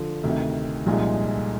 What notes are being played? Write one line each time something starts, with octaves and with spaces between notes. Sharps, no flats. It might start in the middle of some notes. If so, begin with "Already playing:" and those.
Already playing: D3 F3
D2 C3 D#3
C2 A#2 F3 G#3 D#4